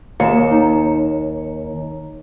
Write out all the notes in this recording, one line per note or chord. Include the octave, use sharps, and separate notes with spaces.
D#2 C#7 E7
D#4 C#5 A#5